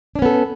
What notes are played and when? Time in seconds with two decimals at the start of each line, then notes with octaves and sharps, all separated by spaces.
0.15 D4
0.19 C#4
0.22 B3
0.26 A4